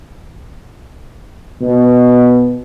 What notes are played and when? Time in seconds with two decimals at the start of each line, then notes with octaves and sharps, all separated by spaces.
1.61 B2